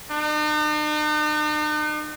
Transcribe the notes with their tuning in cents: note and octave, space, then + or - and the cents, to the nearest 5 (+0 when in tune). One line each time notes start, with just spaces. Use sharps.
D#4 -45